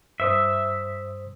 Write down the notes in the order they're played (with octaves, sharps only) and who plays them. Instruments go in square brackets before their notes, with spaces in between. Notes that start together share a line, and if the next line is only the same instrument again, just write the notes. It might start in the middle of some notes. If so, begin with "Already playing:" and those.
[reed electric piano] G2 C5 D#6 [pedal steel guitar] E5